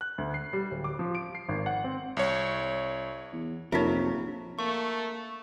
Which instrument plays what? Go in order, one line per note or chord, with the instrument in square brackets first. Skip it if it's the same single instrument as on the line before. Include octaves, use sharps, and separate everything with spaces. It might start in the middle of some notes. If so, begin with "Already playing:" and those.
[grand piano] F#6
D2
C7
G3
D1
D6
F3
D7
C7
G#1
F#5
C4
[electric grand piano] C2 C#5
[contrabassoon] E2
[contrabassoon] A#1 [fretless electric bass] F2 C3 [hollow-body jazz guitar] F#3 A#4 [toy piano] D#4 F4 E5
[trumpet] A3 [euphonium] A#3 [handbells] C#6